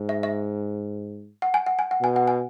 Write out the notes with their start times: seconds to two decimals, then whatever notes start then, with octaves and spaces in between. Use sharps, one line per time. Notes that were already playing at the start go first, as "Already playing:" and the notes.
Already playing: G#2
0.09 E5
0.23 E5
1.42 F#5
1.54 G#5
1.67 F#5
1.79 G#5
1.91 F#5
2.01 B2 G#5
2.16 F#5
2.28 G#5